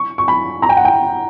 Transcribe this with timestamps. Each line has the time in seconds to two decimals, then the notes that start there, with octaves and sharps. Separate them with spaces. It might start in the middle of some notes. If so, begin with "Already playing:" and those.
Already playing: C#6
0.18 C#6
0.28 B5
0.62 A#5
0.69 G5
0.77 F#5
0.85 G5